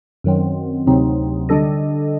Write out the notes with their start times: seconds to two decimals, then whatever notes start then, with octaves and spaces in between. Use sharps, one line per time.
0.24 F#2 D#3 F#3 C4
0.87 D2 C3 F#3 C4 D#4
1.49 D3 G3 D4 A4 D#5